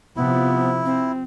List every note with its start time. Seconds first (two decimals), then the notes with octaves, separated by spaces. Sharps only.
0.16 C3 F3 B3 E4
0.85 C4